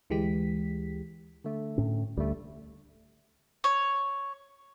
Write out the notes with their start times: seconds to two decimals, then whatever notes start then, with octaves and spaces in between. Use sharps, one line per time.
0.10 D2 E3 G#3 G4 B6
1.45 D3 A3
1.78 A2 C#4
2.17 D2 G3 A3
3.64 C#5